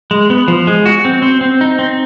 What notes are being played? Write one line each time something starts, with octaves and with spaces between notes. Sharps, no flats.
G#3
B3
F3
G#3
F#4
C4
C4
C4
D#4
C4